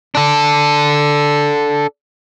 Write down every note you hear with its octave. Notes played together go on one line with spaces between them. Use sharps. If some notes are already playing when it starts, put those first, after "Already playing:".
D4 A4